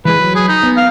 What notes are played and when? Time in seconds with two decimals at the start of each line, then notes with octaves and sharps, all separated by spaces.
0.05 E3 G#3 G#4 B4
0.19 F#3
0.35 G#4
0.48 D#4
0.63 B3
0.77 F5